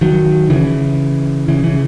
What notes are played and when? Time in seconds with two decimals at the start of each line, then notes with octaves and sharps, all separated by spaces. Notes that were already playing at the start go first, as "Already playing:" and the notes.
0.01 D#3 F#3
0.50 C#3 E3
1.48 C#3 E3
1.63 C#3 E3